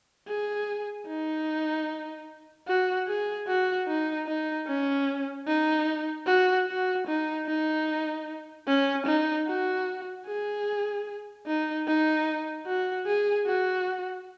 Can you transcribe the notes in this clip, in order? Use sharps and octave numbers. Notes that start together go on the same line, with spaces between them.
G#4
D#4
F#4
G#4
F#4
D#4
D#4
C#4
D#4
F#4
F#4
D#4
D#4
C#4
D#4
F#4
G#4
D#4
D#4
F#4
G#4
F#4